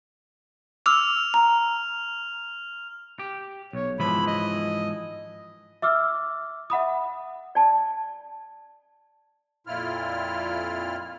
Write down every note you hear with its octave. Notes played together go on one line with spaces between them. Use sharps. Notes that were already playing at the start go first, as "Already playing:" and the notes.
D6 E6 F6 F7
A#5
G4
B1 C#5
G#2 E3 F3 B5
D#5
E5 D6 E6 F6
E5 F#5 B5 D#6
D5 A5
F2 A#2 E4 F4 F6